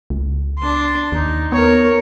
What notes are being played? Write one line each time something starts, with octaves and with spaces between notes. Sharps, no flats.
C#2
D4 C6
D#2 D#4
B3 A#4 C#5